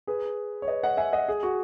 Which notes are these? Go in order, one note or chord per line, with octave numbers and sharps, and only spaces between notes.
G#4 B4
C#5
B4 D#5
D#5 F#5
E5 G#5
D#5 F#5
G#4
F#4